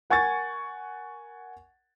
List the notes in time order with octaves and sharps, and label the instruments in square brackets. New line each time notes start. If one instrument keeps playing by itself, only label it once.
[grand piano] A#4 F#5 G#5 C#6 G#6 A6